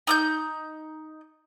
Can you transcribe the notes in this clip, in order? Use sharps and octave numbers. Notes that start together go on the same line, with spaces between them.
D#4 D#6 G6